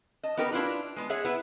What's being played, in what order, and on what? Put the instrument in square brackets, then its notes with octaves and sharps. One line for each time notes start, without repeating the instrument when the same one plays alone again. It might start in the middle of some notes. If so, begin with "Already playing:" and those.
[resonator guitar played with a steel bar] D#5 A5
B3 D#4 G4 A#4 B4
D4 E4 F4 B4
G#3 B3
G#4 C#5 E5 F#5
B3 E4 B4